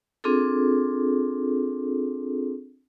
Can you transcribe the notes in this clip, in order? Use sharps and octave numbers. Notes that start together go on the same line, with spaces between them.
C4 D4 F4 G#4 A4